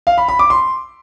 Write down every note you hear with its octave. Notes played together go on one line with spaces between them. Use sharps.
F5
B5
B5
D6
C6